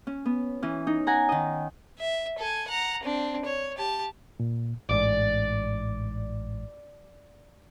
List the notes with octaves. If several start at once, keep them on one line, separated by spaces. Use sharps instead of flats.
C#4
B3
E3 C#4
D#4
F#5 G#5 A#5
D#3 D#5
E5
A4 G#5
F#5 A#5
C4 D4
C#5
G4 A5
A#2
A1 G#2 D5